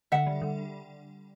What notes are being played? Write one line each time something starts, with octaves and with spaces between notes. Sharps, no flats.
D3 E5 F#5
G3
D3